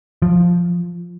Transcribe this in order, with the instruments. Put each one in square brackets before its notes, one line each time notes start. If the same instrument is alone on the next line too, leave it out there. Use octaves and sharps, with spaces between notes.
[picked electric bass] F3